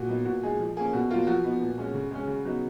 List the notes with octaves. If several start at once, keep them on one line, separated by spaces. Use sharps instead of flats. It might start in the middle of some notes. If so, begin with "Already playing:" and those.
Already playing: A#2 F#4
F#3 B3 D#4
A#2 F#4
G#3 D#4 G#4
F3
A#3 C#4 G#4
B2 F#4
F#3 A#3 F4
F3 F#4
B3 D#4
A#2
G#3 C#4
C#3
G#3 C#4
C#3
F#3 B3 D#4